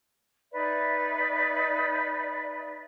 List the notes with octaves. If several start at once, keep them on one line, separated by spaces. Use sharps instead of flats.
D#4 B4 D5 E5